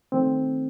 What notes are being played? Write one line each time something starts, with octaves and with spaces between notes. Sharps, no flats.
D#3 A3 C4